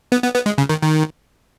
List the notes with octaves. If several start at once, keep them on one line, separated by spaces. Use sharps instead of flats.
B3
B3
B3
G#3
C#3
D#3
D#3